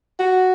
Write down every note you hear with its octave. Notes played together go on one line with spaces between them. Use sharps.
F#4